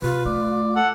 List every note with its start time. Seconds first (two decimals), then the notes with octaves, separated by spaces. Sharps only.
0.02 C3 F4 B4
0.26 A3 D5
0.76 A4 F#5